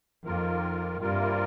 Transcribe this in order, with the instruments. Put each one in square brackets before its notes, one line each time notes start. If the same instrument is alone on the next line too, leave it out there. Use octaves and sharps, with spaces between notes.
[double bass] F2 [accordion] D#3 A#3 F4 A#4
[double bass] G2 [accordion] C3 G3 A#3 F4 A#4